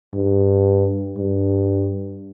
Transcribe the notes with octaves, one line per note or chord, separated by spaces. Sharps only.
G2
G2